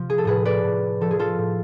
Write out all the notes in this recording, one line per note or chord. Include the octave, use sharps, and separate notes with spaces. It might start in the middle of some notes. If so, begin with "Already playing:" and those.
Already playing: C3 F3 F4
G#4
A4
A2 G#4 B4
B4 D5
A2
F3 A4
G#4
F4 A4
A2